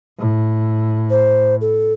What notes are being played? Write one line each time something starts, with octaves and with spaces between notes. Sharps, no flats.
A2
C5
A4